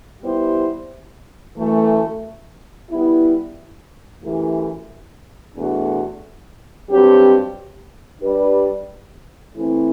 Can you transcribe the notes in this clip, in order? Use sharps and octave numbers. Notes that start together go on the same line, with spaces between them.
G3 B3 E4 G4 C5
F#2 E3 A3
G3 B3 E4
F#2 E3 A3 E4 G4
E2 B2 A3 D4 F#4
G2 F#3 C4 G4
G3 D4 G4 B4 D5
E3 A3 C4 E4